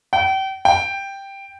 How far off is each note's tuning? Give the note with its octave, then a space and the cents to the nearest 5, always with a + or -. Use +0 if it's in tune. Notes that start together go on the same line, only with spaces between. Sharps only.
G5 -35
G5 +5